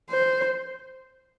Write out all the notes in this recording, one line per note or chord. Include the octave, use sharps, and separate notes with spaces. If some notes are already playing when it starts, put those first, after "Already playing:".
C5